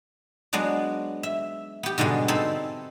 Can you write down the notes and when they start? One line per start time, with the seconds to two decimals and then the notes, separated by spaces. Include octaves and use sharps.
0.53 F#3 G#3 B3 D4 D5
1.23 E5
1.83 B3 G4
1.98 G#2 B2 D3 G3 G#3
2.28 C4 D#4 A4 G#5 B5